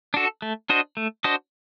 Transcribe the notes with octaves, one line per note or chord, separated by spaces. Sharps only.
D4 F#4 A4
A3
D4 F#4 C5 D#5
A3
D4 F#4 C5 D#5